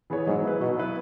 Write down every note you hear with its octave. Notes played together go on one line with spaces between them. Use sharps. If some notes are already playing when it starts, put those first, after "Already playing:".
E3 B3 G#4 C#5
G#2 F#3
B3 E4 B4
B2 F#3
B3 E4 B4